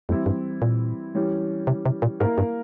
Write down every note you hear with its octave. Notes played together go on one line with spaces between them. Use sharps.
F2 E3 G3 C4 E4
G2
A#2
E3 G3 C#4 G4
C3
C3
A#2
G#2 A#3 E4 A#4
G2